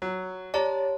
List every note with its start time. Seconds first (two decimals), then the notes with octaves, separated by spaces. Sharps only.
0.02 F#3
0.54 G4 C#5 D5 A5 A#5